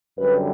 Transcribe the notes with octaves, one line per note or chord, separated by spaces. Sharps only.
F#2 D3 G3 B4